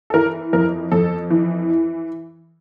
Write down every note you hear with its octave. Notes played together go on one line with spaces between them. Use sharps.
A4
E3 A#4
F2 A#4
F2 A4
E3